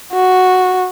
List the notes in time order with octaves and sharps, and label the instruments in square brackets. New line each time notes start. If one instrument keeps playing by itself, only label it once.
[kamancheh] F#4